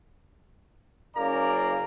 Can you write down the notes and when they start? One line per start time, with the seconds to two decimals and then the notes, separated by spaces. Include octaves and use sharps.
1.16 F#1 C#3 A#3 D5 A#5